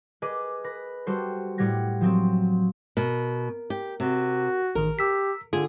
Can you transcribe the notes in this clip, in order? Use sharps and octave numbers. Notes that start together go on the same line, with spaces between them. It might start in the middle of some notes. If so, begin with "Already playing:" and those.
G#4 B4 D#5 G#5 D6
B4 B5 A#6
G3 F#4 A4 C5
A2 G3 F#5 G#6 A#6
F3 F#3 C4
B2 A#4
G4
C3 F#4
A1 D#3 A#4
G4 E6 B6
D3 F4 G#4